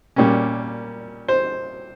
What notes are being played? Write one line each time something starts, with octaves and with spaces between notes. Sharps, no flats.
A#2 G3 C#4
C5